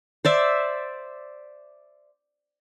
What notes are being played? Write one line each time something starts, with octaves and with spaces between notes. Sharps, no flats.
C5 D5 E5